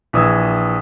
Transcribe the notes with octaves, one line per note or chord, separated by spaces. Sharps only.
A#1 E3 D#6 E6 G#6